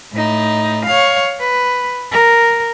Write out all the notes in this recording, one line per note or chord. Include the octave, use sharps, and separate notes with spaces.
A2 D#4
C#5 F5
B4
A#4